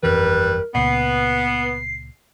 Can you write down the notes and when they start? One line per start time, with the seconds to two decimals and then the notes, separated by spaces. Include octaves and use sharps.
0.03 G1 F2 E3 G3 A#4 B4
0.75 C#2 A#2 B3 C7